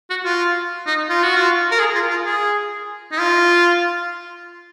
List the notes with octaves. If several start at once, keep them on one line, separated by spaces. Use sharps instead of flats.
F#4
F4
D#4
F4
F#4
F4
A#4
G#4
F4
F4
G#4
D#4
F4